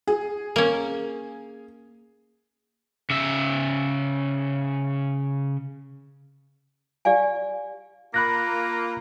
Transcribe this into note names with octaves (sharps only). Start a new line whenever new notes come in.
G#4
A#3 C#4
C#3 E5
G4 D5 F5 G#5
A#3 F4 B5 F#6 A#6